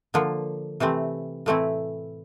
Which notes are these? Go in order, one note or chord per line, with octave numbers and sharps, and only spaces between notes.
D3 F3 A#3
C3 E3 A3 C4
A2 E3 A3 C4 E4